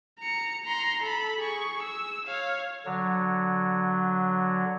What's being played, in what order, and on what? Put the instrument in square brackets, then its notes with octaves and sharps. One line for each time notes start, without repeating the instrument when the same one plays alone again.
[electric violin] A#5 C#7
A#5 C6
A4 B5
G#4 C#6
E6
C#5 F5
[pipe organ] D3 F#3